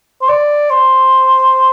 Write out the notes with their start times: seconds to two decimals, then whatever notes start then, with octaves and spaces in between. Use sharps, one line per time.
0.22 C5
0.29 D5
0.71 C5